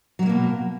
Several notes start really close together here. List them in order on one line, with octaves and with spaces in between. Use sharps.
F#3 G#3 A#3 B2